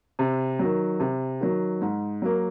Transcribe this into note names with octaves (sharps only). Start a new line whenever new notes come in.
C3
D#3 F#3
C3
D#3 F#3
G#2
F#3 A#3